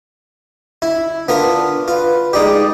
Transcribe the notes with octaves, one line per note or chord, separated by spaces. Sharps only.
E4
B3 D4 F4 A#4
F4 B4
G#3 D#4 G4 D5